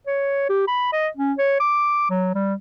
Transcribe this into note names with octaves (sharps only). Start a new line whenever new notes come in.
C#5
G4
B5
D#5
C#4
C#5
D6
F#3
G3